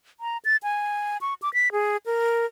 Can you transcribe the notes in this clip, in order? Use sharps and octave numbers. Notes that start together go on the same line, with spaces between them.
A#5
A6
G#5
C#6
D6
B6
G#4
A#4